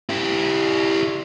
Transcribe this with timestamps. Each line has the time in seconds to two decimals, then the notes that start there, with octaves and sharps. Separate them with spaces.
0.09 E4 G4